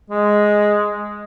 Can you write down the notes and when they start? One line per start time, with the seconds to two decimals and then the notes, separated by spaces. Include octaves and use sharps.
0.10 G#3